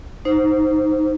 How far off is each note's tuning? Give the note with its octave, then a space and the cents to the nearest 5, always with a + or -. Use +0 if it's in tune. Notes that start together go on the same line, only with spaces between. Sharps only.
D#4 +0 C5 +0